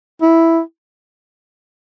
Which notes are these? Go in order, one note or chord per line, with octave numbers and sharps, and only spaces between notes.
E4